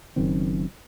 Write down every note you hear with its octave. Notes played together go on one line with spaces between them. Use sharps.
F#1 F#2 D#3 C4